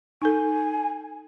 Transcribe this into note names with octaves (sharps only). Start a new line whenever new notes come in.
D#4 A4 G#5